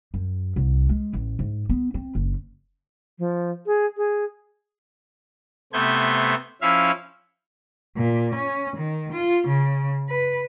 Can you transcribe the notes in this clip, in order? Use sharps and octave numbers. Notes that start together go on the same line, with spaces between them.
F#2
C2
G#3
A1
G#2
B3
C4
F#1
F3
G#4
G#4
C3 A3 B3 C5 G6 G#6
F3 C#4 E4 E5 F5
A#2
C#4
D#3
F4
C#3
B4